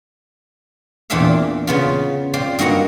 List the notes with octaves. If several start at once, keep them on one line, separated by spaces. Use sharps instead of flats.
E2 A#2 C4 D4 E5 F5
C#3 B3 F4
C4 F4 C5 D5 C6
G2 A#3 D#4 F#4 F#5 A#5